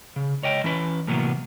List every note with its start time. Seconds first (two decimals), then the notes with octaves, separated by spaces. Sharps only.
0.16 C#3
0.43 C#2 C#5 D#5 G5
0.64 E3 C#4 B4
1.07 A2 C3 E3 F#3 A#3 B3